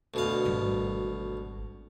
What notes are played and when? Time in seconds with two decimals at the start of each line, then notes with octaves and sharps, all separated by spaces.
0.14 D2 B2 F5
0.45 G#1 G3